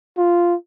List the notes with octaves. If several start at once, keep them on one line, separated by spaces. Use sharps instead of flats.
F4